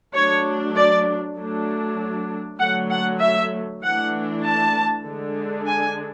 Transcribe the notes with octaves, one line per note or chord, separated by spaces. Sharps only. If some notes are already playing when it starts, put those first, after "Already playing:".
F#3 A3 D4 C#5
D5
F#3 A3 D4
D3 F#3 A3 F#5
F#5
E5
E3 A3 D4 F#5
A5
D3 G#3 D4
G#5